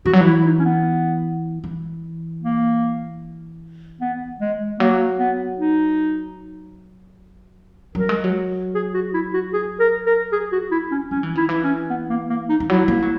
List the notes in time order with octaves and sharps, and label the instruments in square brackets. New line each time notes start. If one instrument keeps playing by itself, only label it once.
[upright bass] E3 [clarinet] F#4
[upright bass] F#3
E3
[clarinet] E4
D#4
C#4
B3
[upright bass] E3
[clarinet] A#3
B3
G#3
[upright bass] F#3 [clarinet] A#3
[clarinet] B3
D#4
[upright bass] F#3 [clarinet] A#4
[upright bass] G#3
F#3
[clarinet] G#4
F#4
E4
F#4
G#4
A#4
A#4
G#4
F#4
E4
C#4
[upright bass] F#3 [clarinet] C#4
[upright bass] E3
[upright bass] D#3 [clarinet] E4
[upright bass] E3
[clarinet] C#4
B3
A#3
A#3
D#4
[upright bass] E3
[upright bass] F#3 [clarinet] E4
[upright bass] A#3
F#3